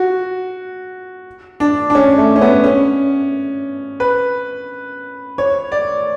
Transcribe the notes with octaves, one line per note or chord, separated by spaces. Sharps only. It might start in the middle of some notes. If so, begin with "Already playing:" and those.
Already playing: F#4
D4
D4
C#4
A3
C#4
B3
C#4
B4
C#5
D5